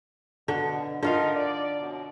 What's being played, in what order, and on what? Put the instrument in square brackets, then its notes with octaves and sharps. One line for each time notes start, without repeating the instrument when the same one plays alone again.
[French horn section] B2 [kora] D3
[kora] D3 F4 F5 [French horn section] D#4 A#4
[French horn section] D5
F#2 B2